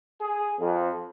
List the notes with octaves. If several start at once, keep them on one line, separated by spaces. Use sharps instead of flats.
G#4
F2